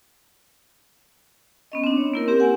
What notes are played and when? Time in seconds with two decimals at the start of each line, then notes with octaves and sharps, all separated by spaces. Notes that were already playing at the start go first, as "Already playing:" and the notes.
1.72 B3 C#4 D#5
1.84 C4 D4
1.97 C#5
2.14 A#3 E4 A#4
2.28 C4 G4
2.40 F#5 G#5